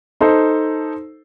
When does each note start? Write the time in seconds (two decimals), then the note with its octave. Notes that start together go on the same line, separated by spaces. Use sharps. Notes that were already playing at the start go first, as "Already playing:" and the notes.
0.21 D#4 A4 C5